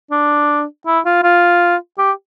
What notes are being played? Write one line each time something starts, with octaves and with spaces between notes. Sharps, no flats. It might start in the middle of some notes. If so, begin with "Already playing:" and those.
D4
E4
F4
F4
G4